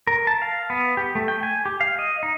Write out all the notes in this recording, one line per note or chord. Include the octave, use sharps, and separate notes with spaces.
A#4
A5
F5
B3
G4
A3
G5
G#5
G4
F5
D#5
D#4